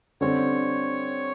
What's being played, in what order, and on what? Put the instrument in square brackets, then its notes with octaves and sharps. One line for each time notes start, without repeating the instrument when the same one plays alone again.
[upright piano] D3 G3 C4 [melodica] C#5